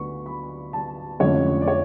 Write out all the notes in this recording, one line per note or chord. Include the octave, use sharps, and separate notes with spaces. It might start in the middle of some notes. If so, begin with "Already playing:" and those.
Already playing: D2 D3 B3 D4 B5 C#6
B5
A5
F1 F2 D3 G#3 C#4 C#5
D5
C#5